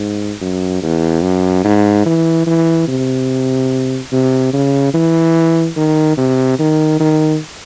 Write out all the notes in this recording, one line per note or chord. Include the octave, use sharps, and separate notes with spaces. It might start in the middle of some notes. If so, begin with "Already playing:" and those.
Already playing: G#2
F#2
E2
F#2
G#2
E3
E3
C3
C3
C#3
E3
D#3
C3
D#3
D#3